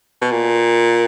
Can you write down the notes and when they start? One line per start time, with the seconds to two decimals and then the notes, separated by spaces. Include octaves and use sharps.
0.22 B2
0.31 A#2